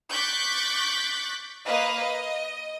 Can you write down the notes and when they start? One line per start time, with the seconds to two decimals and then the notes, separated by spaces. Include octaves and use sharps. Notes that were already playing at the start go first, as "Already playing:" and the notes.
0.11 C#6 D6 F#6 G6 A6 B6
1.66 A#3 B4 D#5 F5
2.02 D#5